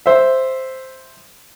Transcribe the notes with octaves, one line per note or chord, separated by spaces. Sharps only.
C5 E5